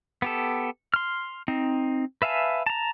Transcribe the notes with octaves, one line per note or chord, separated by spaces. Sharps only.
B3 G4 A4
C6 F6
C4 D#4
B4 E5 F5 G#5 A5
A5 A#5